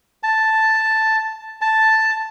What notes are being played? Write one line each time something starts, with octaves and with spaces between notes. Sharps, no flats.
A5
A5